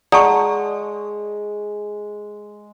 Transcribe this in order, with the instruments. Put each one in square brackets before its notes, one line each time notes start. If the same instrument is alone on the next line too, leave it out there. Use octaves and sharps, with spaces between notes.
[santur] G#3 [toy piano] D5 A5 C#6 [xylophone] F#5 A#5 D#6